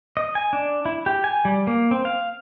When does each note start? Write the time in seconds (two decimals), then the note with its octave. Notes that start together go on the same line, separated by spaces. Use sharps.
0.17 D#5
0.35 G#5
0.53 D4
0.86 E4
1.06 G4
1.24 G#5
1.45 G3
1.67 A#3
1.91 C4
2.05 F5